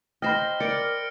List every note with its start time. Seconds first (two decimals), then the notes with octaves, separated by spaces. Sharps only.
0.22 C5 D#5 G5 B5 F6 A#6 G7
0.60 A#4 D5 C#7 D7